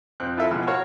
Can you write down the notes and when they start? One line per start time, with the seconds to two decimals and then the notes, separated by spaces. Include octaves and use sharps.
0.20 F2 C4 F#6
0.37 E4 F4 A4 A#4 E5 F5
0.50 B2 E3 F3 G#3
0.67 F#4 A#4 C#5 F5